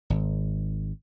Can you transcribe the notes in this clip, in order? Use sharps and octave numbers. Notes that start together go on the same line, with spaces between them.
G#1